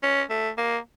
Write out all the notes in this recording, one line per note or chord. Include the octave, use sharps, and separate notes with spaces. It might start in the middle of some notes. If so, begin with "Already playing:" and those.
C#4
A3
A#3